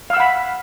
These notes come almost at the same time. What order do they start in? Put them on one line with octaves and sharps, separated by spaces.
F5 E6 F#5 B5